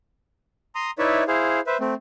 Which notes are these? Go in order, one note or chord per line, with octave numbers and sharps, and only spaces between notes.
A#5 C6 D#6
D#4 E4 B4 C#5 D5 E5
E4 G#4 C5 F5
B4 C5 E5
A3 C4